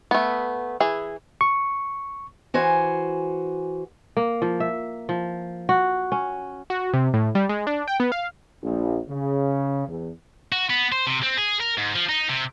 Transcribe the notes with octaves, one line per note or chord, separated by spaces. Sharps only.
A3 B3
E3 G#4
C#6
E3 F#4 C5 G#5
A#3
F3
E5
F3
F#4
C#4
F#4
C3
A2
G3
G#3
D4
G5
B3
F5
A#1
C#3
E2
F#4
B3
C5
C3
C4
G#4
A#4
G#2
F3
D#4
C3